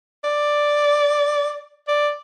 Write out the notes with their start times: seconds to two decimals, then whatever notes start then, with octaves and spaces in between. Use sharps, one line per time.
0.24 D5
1.88 D5